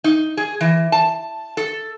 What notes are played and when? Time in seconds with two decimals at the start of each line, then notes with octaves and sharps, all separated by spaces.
0.04 D#4
0.37 G#4
0.61 E3
0.92 A5
1.57 A4